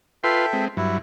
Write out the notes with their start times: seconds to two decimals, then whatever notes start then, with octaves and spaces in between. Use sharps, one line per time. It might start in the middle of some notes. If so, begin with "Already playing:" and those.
0.24 F4 A4 B4 E5 G5 C6
0.53 G#3 C4
0.77 G2 F#3 E4